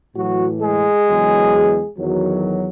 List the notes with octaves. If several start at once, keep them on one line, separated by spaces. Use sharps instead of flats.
A2 E3 F#3 F#4
G#3 G#4
E2 C#3 F#3
E2 D#3 F#3